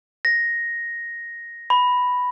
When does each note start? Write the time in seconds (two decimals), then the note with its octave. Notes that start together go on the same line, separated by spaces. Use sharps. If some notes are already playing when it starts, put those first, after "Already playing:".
0.25 A#6
1.70 B5